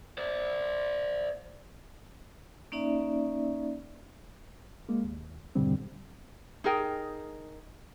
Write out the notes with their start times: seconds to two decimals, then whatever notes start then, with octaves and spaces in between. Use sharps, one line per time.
0.18 C5 D5
2.72 A#3 C#4 D#4 D5 E5
4.89 G#3 A#3
5.04 D#2
5.55 E2 G2 B2 D3 G3 C4
6.64 D#4 G#4 A#4 G5